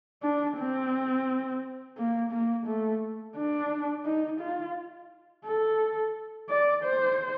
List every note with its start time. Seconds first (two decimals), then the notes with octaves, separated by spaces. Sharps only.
0.23 D4
0.58 C4
1.98 A#3
2.32 A#3
2.67 A3
3.37 D4
4.05 D#4
4.41 F4
5.45 A4
6.50 D5
6.84 C5